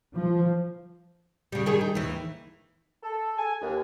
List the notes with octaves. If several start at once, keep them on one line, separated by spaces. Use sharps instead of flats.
F3
C#3 G3
D#3 G3 G#4
D#4
D#2 E3
A4
G#5
D#2